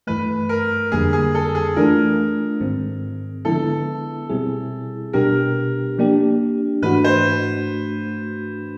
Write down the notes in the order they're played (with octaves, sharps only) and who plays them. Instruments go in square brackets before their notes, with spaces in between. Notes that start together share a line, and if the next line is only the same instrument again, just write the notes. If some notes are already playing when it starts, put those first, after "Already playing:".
[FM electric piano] G2 E3 A3 [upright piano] B4
[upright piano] A#4
[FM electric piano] F2 D3 G3 A#3 [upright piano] G#4
[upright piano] G#4
A4
G#4
[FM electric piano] E3 A3 D4 F4 [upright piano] A#4
[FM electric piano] G#2 D#3 G#3 C4
[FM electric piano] D3 F3 G#3 B3 E4 [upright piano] A4
[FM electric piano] B2 G3 C4 E4 G#4
[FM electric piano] B2 G3 B3 D4 G4 [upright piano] A#4
[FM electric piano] F3 A#3 D4 G4
[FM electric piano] G#2 E3 A3 D4 F#4 [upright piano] B4
[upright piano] C5